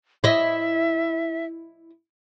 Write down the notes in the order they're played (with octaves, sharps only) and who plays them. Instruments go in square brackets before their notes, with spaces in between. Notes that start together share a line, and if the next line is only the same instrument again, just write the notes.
[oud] E4 D#5 [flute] E5